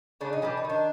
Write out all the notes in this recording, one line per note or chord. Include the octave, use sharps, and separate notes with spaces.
C#3 D4
D#4
E3 G3 D4
D#4
D#3
D4